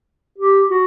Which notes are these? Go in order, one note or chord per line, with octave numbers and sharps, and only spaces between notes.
G4
F#4